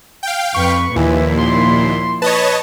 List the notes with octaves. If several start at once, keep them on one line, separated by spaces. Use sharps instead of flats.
F5 G5
F2 B4 C#6
D#2 A#2 E3 F3 E4
C6
B4 C#5 D#5 A5